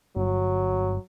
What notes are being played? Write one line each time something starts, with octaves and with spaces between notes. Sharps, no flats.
G1 F#3